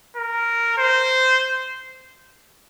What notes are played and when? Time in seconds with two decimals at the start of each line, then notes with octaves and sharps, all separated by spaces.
0.17 A#4
0.78 C5